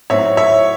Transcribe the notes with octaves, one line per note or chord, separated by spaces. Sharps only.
A2 F#3 C4 D#4 C#5 E5
C#5 E5